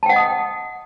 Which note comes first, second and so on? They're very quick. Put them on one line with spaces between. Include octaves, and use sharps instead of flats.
A5 G5 F#5 D#5 D#6